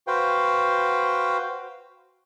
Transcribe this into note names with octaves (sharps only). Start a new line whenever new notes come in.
F#4 B4 C5 F5 G5